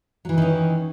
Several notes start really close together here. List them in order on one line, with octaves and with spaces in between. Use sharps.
F#3 E3 D#4 D#3 C#4